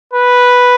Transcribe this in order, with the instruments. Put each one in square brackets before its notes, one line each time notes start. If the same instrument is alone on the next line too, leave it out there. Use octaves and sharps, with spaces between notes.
[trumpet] B4